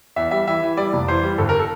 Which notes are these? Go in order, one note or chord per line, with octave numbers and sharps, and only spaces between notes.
E2 E5
G3 E5
E3 E5
E3
G3 D5
F1
E3 C5
G3
G1 A4
A#4
A4